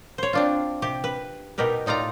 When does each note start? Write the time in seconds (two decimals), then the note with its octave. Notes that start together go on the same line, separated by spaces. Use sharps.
0.18 C5 C#5
0.33 C4 D4 F4
0.82 C3 G4
1.04 B4
1.58 B2 D#4 G4 A#4 B4
1.86 A2 D#4 F4 D5 A#5